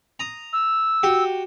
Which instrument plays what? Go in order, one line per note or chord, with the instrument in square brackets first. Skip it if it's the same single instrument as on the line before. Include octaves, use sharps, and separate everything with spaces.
[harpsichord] A#5 D#6
[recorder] E6
[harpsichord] F#4 G4